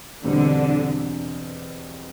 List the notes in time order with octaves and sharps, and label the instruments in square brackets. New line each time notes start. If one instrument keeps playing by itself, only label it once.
[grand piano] E2 B2 G3 C4 [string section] D3